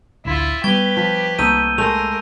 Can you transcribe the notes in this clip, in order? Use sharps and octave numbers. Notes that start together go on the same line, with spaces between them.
A1 D2 E4 F4
G3 A3 B3 G4 B4 C#6 G#6 G7
F3
C2 A3 A#3 D#4 E6 G6 D#7
G#3 A3 A#4 F7